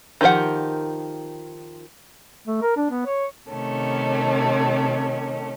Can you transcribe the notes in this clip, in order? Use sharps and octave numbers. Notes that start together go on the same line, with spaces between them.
D#3 F3 G4 A#4 F#5
A3
A#4
D4
B3
C#5
C3 D#3 A3 C#4